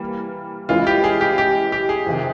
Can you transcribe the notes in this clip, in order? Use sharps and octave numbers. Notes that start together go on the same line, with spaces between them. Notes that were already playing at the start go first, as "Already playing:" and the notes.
Already playing: E3 G3 A#3
E3 G#3 C#4 E4 F4
G4
G#4
G4
G4
G4
G#4
F2 C3 D#3